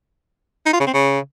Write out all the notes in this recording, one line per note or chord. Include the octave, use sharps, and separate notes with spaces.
D#4
F4
C#3
C4
C#3